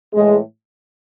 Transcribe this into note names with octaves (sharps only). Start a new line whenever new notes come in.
A2 E3 G#3